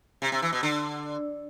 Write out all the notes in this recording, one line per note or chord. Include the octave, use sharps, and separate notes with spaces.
C3
C3
E3
B2
D3